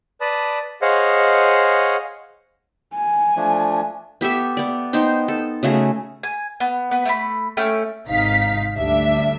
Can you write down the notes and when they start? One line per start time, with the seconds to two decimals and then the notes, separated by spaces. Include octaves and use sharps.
0.21 B4 D5 A5 B5 D#6
0.82 G#4 C5 C#5 D#5 F5 F#5
2.94 G#5
3.36 F3 A3 D4
4.21 B3 G4 A4 E5
4.57 B3 D5
4.93 B3 D#4 C5 G5
5.28 A4
5.63 C#3 A3 F#4 G#4
6.23 G#5
6.60 B3
6.91 B3 B4
7.05 A3 G5 B5
7.57 A3 C#4 G5
8.08 G#1 C3 D#4 F5 B6
8.76 D2 G3 D4 E5